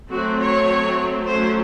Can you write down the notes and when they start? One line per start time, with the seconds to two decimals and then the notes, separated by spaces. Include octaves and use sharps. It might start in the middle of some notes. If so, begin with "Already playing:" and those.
0.10 F#3 A3 C4 F#4
0.40 C#5
1.26 F#3 A3 C#4 C5